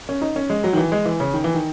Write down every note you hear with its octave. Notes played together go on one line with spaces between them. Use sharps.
C#4
D#4
C#4
G#3
F#3
D#3
E3
G#3
E3
C#3
D#3
E3
D#3